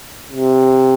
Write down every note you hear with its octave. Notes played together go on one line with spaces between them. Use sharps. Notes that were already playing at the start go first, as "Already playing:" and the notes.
C3